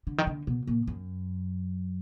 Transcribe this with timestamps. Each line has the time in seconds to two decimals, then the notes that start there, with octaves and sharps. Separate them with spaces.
0.07 D3
0.18 D#3
0.27 D3
0.47 B2
0.67 A#2
0.87 F#2